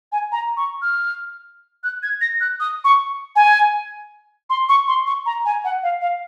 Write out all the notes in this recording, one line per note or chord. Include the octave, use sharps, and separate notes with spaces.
G#5
A#5
C#6
F6
F#6
G#6
A#6
F#6
D#6
C#6
G#5
C6
C#6
C6
C#6
A#5
G#5
F#5
F5
F5